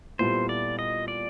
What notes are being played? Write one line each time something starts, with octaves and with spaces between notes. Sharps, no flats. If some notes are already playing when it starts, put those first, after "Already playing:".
A#2 G3 B3 E4 A4 C5
D5
D#5
D5